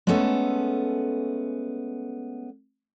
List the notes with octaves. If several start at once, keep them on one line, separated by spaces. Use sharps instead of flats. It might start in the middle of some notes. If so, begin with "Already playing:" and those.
G#3 A3 B3 C#4 A4